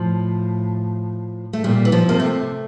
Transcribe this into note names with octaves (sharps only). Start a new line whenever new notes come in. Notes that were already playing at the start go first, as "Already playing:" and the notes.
Already playing: A2 F3
A3
A#2 G3
E3
F3
C3 A#3
A3